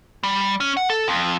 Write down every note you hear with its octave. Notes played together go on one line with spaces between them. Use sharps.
G3
C#4
F#5
A4
F2